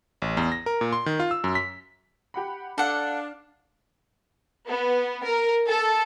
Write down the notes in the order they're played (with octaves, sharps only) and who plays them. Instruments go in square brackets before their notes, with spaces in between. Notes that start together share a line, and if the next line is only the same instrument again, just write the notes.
[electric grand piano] A1
E2
A#6
A#4
A#2
C6
D#3
F4
E6
F#2
B6
[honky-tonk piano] G4 F#5 B5
[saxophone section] D4 [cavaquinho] A4 F#5 [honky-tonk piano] F5
[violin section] B3
A#4
A4